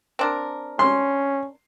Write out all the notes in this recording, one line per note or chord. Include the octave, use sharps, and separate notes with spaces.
C4 D4 A#4
C#4 C6